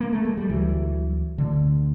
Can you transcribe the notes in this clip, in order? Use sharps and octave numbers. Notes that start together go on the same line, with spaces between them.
A#3
A3
G#3
G3
D2 D3 E3 F#3
D2 D3